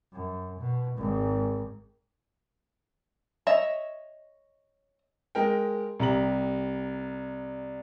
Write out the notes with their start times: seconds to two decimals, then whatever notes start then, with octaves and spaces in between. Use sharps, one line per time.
0.13 F#2
0.60 B2
0.98 G#1 G#2
3.47 C#5 D#5 E5
5.35 G#3 A#4 G5
5.99 C2 G4 A#5 F#7